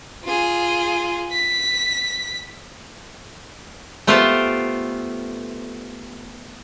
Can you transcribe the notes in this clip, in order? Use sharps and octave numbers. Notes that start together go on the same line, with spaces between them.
F4 G#4
B6
A3 B3 F4 G4 A4 C5